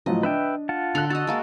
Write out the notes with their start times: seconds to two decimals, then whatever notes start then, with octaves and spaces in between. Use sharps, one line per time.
0.06 A2 F3 F#3 D#5
0.23 D4 B4 E5 G5
0.69 F4 F#5 A5
0.95 D3 A4 C6 F#6 F7
1.10 F#4 D#5 A5 E6
1.27 G#3 A#3 F#4